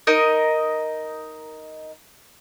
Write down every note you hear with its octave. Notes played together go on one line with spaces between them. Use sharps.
D#4 A#4 D#5